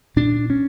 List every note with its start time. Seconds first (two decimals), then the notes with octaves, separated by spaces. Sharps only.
0.16 A#2 D4
0.50 C#4